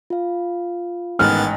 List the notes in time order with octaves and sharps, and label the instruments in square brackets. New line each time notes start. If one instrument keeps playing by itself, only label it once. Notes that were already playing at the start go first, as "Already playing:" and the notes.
[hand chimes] F4 F5
[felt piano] A1 G#2 [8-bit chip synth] D#3 B3 A6 [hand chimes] G5 G#5 [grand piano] F6